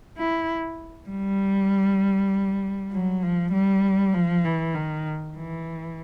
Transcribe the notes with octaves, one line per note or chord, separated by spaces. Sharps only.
E4
G3
F#3
F3
G3
F3
E3
D#3
E3